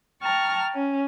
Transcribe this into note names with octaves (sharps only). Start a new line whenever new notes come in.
G5 A5 A#5 C#6 F6
C#4